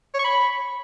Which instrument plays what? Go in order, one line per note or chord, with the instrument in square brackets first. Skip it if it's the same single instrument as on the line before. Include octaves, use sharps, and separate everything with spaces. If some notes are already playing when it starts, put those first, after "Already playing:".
[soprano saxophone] C#5
C#6
B5